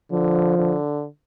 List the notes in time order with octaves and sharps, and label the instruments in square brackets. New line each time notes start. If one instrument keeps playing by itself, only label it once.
[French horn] D3 [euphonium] F3
[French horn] D3